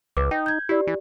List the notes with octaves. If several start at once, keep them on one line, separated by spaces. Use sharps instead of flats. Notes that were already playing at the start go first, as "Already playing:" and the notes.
C#2 B4 D6
D#4 G5
G6 G#6
E4 G4 D5
E3